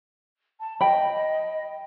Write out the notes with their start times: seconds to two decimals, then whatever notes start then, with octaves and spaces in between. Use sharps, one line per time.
0.60 A5
0.81 D#5 G5 B5